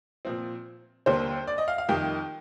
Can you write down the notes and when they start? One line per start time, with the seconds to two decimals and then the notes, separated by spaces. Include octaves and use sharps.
0.25 A#2 F3 C4
1.06 D#2 D3 G3 A#3 C5
1.47 D5
1.58 D#5
1.68 F5
1.78 F5
1.89 F2 D#3 G3 G5